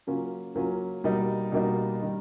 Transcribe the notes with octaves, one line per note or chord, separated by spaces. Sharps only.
C#3 F#3 A#3 C#4 F4
C#3 F#3 A#3 C#4 F4
B2 G3 A#3 D#4
B2 G3 A#3 D#4
D#3 G3